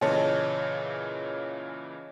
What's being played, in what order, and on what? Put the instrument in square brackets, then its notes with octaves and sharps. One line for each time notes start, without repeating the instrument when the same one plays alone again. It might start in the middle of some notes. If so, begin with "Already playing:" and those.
[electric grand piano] A#2 C#3 E3 [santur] C#5 D#5 A5